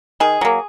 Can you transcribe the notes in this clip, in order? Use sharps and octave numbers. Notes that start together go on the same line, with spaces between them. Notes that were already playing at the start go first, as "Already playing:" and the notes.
D#3 G#4
F#3 A#3